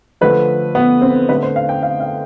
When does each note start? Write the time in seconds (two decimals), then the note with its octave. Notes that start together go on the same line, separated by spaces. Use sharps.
0.21 D3 F3 A3 B4
0.75 B3
1.01 C4
1.29 D3 A3 B4
1.43 C5
1.56 F5
1.69 G5
1.83 F5
2.00 F5